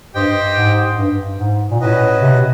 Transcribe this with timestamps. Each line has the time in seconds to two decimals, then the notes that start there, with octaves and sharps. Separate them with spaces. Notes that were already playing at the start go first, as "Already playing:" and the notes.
0.15 G2 G4 C5 D#5 G5
0.57 G#2
0.97 G2
1.39 G#2
1.70 A#2
1.80 A2 C#4 F#4 B4 D#5
2.21 C3
2.32 B2